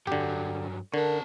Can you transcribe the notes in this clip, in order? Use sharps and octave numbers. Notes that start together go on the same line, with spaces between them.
G2 D3 F#3 G4
D3 C#4 A#4 A5